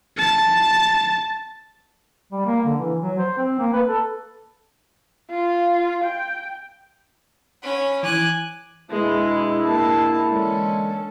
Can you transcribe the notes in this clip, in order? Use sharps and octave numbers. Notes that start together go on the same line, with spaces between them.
A5
G3
A#3
D3
E3
F#3
C5
C4
A#3
B4
A4
F4
G5
C#4 F#5 B5
E3 G#5 D6 F#6
B2 G#3 D4 E4 G#4
A#3 A5
D3 E3 G#3 C#4 A4